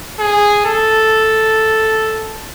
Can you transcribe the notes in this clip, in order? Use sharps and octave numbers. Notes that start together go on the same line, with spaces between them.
G#4
A4